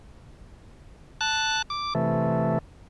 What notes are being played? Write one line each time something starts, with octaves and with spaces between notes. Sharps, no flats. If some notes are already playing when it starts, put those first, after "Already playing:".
A5 F#6
D6
C3 E3 A3